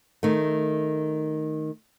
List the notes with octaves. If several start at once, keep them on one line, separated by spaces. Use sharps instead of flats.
D#3 A3